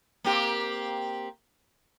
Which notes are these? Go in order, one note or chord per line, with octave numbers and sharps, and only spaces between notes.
A#3 C4 G4